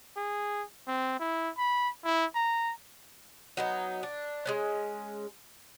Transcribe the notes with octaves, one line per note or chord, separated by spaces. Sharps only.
G#4
C4
E4
B5
E4
A#5
F#3 B3 D#4
D4
G#3 B3 C#4